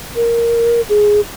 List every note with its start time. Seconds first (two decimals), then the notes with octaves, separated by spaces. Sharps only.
0.16 A#4
0.89 G#4